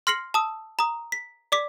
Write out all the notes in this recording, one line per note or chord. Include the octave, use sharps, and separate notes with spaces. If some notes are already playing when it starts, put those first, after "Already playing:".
C6 F6 A#6 C7 C#7 F#7
A5 D#6 E6
A#5 D#6
B6
D5 D6 B6